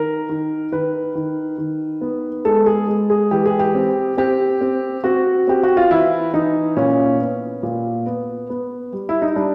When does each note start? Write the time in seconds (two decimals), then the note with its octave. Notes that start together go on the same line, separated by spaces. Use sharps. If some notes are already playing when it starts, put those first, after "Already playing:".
Already playing: D#3 A#4
0.29 D#3
0.72 D#3 B4
1.15 D#3
1.58 D#3
2.01 B3
2.45 G#3 A4
2.66 G#4
2.88 G#3
3.10 G#4
3.31 E3 G4
3.46 G#4
3.59 G4
3.75 C4
4.17 C4 G4
4.61 C4
5.04 C4 F#4
5.47 C4 G4
5.63 F#4
5.77 F4
5.91 E3 E4
6.33 E3 D#4
6.77 A#2 C#4
7.20 B3
7.63 A#2
8.06 B3
8.50 B3
8.93 G3
9.09 E4
9.22 D#4
9.36 G3 D4